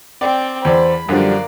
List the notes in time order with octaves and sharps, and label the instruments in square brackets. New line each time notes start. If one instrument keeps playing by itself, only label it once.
[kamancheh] C4 G5 [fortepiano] D5
[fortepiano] E2 D5 [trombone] C5 [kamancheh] B5
[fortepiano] F#2 D3 F3 [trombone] G3 [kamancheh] A#3 D5